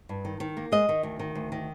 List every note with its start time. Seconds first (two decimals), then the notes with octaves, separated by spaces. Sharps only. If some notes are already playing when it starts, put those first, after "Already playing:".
0.09 G2
0.25 D#3
0.40 D#3
0.57 A#3
0.72 G#3 D#5
0.89 D#3
1.03 D2
1.19 D#3
1.35 D2
1.52 D#3